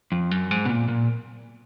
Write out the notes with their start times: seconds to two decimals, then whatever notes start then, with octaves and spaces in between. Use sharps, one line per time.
0.12 F2
0.31 F#2
0.51 G#2
0.65 B2
0.69 A#2
0.88 A#2